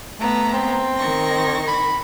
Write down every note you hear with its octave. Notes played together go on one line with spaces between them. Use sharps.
A3 B3 A#5
C4
D#3 C#6 A#6
B5